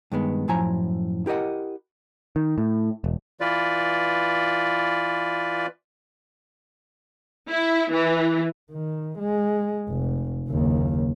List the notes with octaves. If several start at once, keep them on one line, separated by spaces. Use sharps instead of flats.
G2 D#3 G#3 B3
F#2 A2 F3 E4 G#5 A#5
E4 G4 A#4 D#5 F#5
D#3
A2
E1
E3 F4 B4 D5
E4
E3
D#3
G#3
F1
F#1 D#2